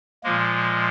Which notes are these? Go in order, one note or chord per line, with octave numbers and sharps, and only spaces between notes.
A#2 F3 G#3 A#3